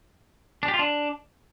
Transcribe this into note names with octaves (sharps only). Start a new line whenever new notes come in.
D4
G4
F4
D4